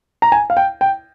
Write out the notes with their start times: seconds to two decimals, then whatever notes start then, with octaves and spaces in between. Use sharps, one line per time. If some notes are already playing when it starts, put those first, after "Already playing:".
0.22 A#5
0.32 G#5
0.50 F5
0.57 G5
0.81 G5